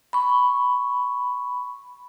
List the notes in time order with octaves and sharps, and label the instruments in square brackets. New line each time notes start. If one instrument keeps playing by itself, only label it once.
[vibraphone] B5 C#6